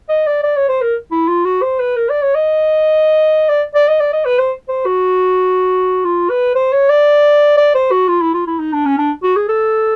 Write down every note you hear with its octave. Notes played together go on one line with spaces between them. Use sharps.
D#5
D5
D5
C#5
C5
A#4
E4
F4
F#4
C5
B4
A#4
D5
C#5
D#5
D5
D5
D#5
D5
D#5
B4
C5
C5
F#4
F4
B4
C5
C#5
D5
D5
C5
F#4
F4
E4
F4
E4
D#4
D4
C#4
D4
F#4
G#4
A4